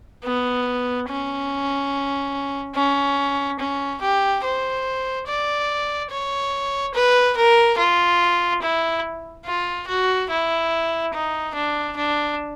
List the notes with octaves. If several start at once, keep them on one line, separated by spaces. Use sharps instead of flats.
B3
C#4
C#4
C#4
G4
C5
D5
C#5
B4
A#4
F4
E4
F4
F#4
E4
D#4
D4
D4